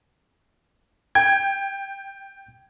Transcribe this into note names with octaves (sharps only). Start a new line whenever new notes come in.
G5 G#6